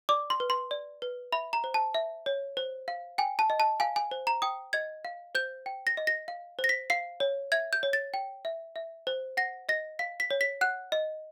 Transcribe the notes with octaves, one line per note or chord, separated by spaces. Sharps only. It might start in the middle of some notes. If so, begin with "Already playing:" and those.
D5 D6
C6
B4
C6
D5
B4
E5 B5
A#5
C5
A5
E5
C#5
C5
F5
G5 G#5
A5
D#5
A5
F5 G#5
G#5
C5
A#5
G5 D#6
D#5 G#6
F5
C5 G6
G5
A#6
D#5
A#6
F5
C5
A#6
B6
F5 C7
C#5
E5 G#6
G6
C#5
A6
G5
E5
E5
C5
F#5 A#6
D#5 A#6
F5 B6
B6
C#5
B6
F#5 F#6
D#5